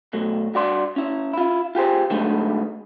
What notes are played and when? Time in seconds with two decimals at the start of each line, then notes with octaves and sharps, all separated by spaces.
0.13 B2 F#3 A3
0.54 G2 F#4 D5 C6
0.96 C#4 E4
1.33 E4 F4
1.75 F4 G4 G#4 C5
2.10 D3 F#3 G#3 A3 B3 D#4